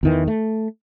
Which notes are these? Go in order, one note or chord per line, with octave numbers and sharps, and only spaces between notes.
E2 D#3 E3
A3